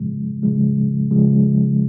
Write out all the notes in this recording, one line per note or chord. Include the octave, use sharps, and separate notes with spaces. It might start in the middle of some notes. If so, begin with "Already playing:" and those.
Already playing: C#3 F3 G#3
C#3 F3 G#3
C#3 F3 G#3